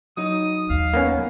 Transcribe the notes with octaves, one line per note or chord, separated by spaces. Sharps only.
F#3 D#4 D#6
D#2 F5
A#3 B3 C#4